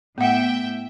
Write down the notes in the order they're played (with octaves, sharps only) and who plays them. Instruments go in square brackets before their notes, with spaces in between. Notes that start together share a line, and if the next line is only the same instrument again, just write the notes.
[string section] A2 E5 G5 [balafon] B3 F#5